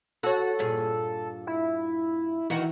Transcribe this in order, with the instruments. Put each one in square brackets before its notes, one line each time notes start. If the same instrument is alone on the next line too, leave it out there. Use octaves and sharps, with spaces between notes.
[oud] F#4 C#5 [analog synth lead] A4
[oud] G2 A#2 G#4
[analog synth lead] E4
[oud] D#3 D#4 F#4 [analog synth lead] E3